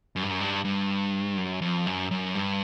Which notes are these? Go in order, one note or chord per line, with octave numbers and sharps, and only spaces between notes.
F#2
G2
F#2
G2
G2
F#2
F2
F#2
F#2
G2